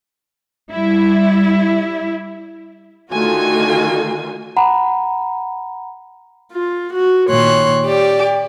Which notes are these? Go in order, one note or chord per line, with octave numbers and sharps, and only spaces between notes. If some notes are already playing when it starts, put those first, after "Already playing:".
G3 E4
D3 D#3 A3 F4 F#4 G#5
F#5 A#5 B5
F4
F#4
A#2 D#3 C#5 C6 F#6
G4 D5